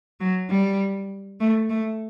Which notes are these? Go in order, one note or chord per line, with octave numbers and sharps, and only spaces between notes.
F#3
G3
A3
A3